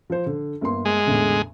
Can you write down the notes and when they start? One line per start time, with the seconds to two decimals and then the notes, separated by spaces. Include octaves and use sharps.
0.10 F3 C5
0.26 D3
0.61 G1 A#3 C6
0.85 G#3
1.07 A1 E2 D3